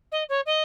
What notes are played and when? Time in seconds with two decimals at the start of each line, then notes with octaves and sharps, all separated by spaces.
0.12 D#5
0.29 C#5
0.46 D#5